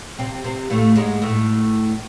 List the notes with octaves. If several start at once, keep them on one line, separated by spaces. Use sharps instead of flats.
C3 C4
C3 C4
A2 A3
G#2 G#3
A2 A3